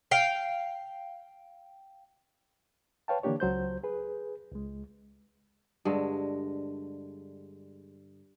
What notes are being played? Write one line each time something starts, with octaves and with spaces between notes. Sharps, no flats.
F5 G5
B4 C#5 F5 G5 A5
D3 E3 A#3 D4 G4 C#5
C#2 F#3 C5 G6
G#4 B4
C#2 G#3
G2 D3 G#3